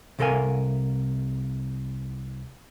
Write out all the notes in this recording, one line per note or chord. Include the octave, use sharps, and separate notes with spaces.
C2 C3 A4 A#4 F5 G#5